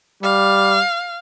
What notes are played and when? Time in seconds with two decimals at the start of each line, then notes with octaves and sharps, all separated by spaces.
0.23 G3 F5